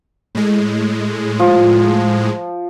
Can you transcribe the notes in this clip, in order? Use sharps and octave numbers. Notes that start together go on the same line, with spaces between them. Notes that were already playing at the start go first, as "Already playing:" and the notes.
A2 G#3
F3